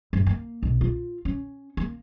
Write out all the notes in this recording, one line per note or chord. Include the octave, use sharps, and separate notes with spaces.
F#2
A#3
B1
F4
C#4
A#3